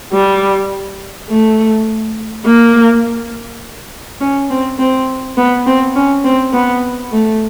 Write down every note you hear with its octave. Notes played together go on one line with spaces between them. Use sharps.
G3
A3
A#3
C#4
C4
C4
B3
C4
C#4
C4
B3
A3